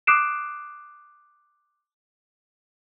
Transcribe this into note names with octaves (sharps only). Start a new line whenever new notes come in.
D6 D#6 F#6 C7 D7 E7